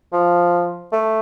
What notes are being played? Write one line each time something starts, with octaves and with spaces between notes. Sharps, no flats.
F3
A3